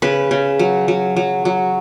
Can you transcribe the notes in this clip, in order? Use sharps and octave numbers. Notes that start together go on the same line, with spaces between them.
C#3 B4
C#3
F#3
F#3
F#3
F#3